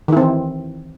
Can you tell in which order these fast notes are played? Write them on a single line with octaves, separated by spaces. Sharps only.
D#3 E4 C4 E3